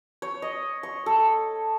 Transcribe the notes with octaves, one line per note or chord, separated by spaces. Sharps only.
C#5
D#5
C#6
A4